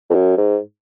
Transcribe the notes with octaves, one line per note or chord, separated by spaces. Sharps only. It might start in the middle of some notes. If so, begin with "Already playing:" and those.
F2
F#2
G#2